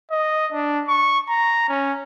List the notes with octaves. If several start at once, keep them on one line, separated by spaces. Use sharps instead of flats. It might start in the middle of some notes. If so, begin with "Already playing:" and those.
D#5
D4
C#6
A#5
C#4